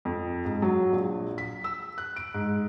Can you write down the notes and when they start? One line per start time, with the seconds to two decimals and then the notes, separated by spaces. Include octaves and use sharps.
0.05 F2
0.45 G#2
0.62 F#3
0.93 A#1
1.38 B6
1.64 E6
1.98 F#6
2.16 D7
2.34 G#2